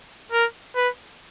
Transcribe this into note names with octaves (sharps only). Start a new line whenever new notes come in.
A#4
B4